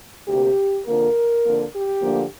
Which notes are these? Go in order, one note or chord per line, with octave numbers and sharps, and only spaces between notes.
D2 C3 A#3 G4
F2 D3 F3 A#3 A#4
F2 D3 A#3
G4
D2 D3 F3 A#3